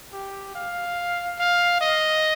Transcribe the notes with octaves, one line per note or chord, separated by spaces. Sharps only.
G4
F5
F5
D#5